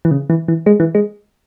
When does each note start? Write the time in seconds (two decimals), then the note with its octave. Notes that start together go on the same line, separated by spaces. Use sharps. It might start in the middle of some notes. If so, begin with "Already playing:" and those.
0.05 E3
0.11 C#3
0.30 E3
0.48 E3
0.66 G#3
0.80 E3
0.95 G#3